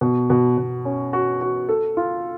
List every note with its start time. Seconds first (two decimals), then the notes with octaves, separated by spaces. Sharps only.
0.01 B2
0.30 B2
0.58 B2
0.85 C#4
1.13 F#4
1.41 F#4
1.69 A4
1.97 F4